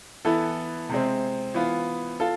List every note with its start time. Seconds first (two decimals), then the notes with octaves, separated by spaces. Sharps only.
0.25 E3 B3 E4 A4
0.89 C3 G#3 C4
1.54 E3 B3 F4
2.20 F4 A4